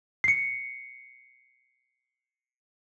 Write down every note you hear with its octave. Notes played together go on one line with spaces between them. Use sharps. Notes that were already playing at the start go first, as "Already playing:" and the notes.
C7 C#7